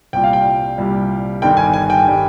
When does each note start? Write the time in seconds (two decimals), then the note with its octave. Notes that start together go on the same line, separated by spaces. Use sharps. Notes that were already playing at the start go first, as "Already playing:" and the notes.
0.13 C2 A#2 G3 G5
0.24 F5
0.33 G5
0.78 C2 A#2 G3
1.42 G1 G2 D#3 G3 G5
1.57 G#5
1.73 G#5
1.90 G5
2.08 D#3 G3